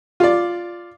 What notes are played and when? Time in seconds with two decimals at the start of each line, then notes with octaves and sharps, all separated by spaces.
0.20 F4 D5